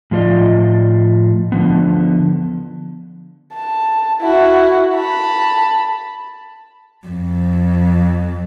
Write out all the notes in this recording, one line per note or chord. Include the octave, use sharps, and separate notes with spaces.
A2 F3 F4 A4 D5 D#5
D3 F3 B3
A5
E4 F#4
A5 B5
F2